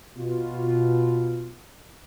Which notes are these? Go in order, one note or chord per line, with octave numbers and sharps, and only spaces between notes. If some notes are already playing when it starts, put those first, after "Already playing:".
B2 F4